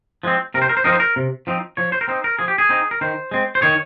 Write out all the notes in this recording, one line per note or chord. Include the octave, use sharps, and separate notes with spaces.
F3 G#3 C4
C3 A#4
C5
A#4
C5
F3 C4 D#4 A#4
C5
A#4
C3
F3 C4 D#4
F3 C#5
C5
A#4
C4 D#4 C5
A#4
F3 G#4
G4
G#4
C4 D#4
A#4
D#3 C5
G#3 C4
C5
D#3 C#5